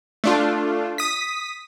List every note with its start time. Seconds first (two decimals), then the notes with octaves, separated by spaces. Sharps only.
0.24 A3 D4 F4
0.98 D#6 B6